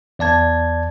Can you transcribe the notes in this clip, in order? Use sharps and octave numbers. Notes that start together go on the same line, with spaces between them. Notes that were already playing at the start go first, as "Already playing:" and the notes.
E2 D5 A5 G#6